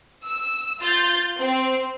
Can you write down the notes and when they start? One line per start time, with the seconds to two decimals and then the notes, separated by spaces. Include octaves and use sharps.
0.23 E6
0.80 F4 G6 A6
1.38 C4